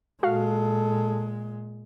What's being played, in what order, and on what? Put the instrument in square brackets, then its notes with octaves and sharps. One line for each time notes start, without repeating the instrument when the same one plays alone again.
[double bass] A#2 G#3 [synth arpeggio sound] F#4 F5 [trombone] A4